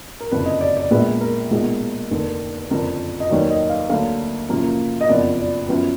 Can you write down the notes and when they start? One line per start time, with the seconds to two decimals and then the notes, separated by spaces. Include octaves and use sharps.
0.21 A#4
0.32 F#1 F2 D3 B4
0.46 D#5
0.61 D5
0.77 D5
0.91 A#1 A#2 G#3 B3 B4
1.21 A#4
1.50 B1 A#2 G#3 B3
2.11 F1 D#2 D3
2.70 F#1 F2 D3 F3 A#4
3.20 D#5
3.30 F1 D#2 D#3 F#3 D5
3.50 D#5
3.69 F5
3.89 D2 D3 F#3 A#3 F5
4.49 F#1 F#2 F3 A#3
5.01 D#5
5.09 F#1 F2 F3 B3 D5
5.38 D5
5.69 F#2 F3 B3 B4